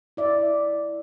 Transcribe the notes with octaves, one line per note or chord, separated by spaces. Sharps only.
E4 D5 E5